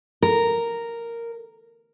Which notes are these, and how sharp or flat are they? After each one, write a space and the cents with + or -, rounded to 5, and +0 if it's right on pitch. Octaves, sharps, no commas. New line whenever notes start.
A#4 -5